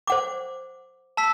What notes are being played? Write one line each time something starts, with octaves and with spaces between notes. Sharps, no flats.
C5 F#5 D6
A5 E6 B6